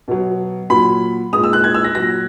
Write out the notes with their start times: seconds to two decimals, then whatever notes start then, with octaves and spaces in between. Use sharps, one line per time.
0.08 B2 F#3
0.70 A#2 F#3 B5
1.33 A#2 G#3 D#6
1.43 E6
1.53 F#6
1.64 G#6
1.74 E6
1.84 A#6
1.95 A#2 F#3 A#6